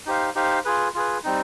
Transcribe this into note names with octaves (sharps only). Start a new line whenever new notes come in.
D#4 G4 C5 F5
D#4 G4 C5 F5
F4 G#4 B4
F4 G#4 B4
G3 C4 D#4